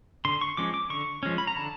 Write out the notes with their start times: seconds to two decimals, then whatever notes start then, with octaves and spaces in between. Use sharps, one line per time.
0.25 D3 C6
0.41 C#6
0.57 F3 G#3 C#4 D6
0.74 D6
0.90 D3 C#6
1.23 F3 G#3 C#4
1.38 B5
1.47 A#5
1.56 D3 A5